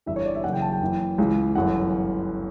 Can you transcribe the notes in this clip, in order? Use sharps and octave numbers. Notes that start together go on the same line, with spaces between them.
G1 G2 E3 E5
C#5
D5
E5
F#1 F#2 C#3 E3 F#5
G5
A5
G5
F#1 F#2 E3
C#2 C#3 E3
G1 F#2 E3 F#5